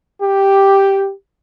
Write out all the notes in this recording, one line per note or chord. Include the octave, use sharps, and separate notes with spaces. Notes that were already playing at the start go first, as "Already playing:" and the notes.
G4